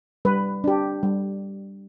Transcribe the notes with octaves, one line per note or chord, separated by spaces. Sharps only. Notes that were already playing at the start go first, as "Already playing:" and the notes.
G3 B4
D4 G4
G3